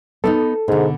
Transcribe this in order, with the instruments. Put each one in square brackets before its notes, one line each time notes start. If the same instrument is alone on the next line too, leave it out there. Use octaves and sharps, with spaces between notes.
[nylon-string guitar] B3 D4 D#4 [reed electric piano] A4
[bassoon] G#2 [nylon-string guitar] B2 D3